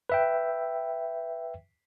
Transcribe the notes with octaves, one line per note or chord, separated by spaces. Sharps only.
B4 E5 G5